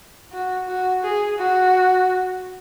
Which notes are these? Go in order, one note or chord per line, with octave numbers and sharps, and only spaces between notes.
F#4
F#4
G#4
F#4